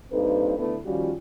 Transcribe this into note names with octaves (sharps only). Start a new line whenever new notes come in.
G2 A#3 C4 D#4 A4 B4
D3 A3 B3 E4
D#3 F3 G3 C#4 F4 F#4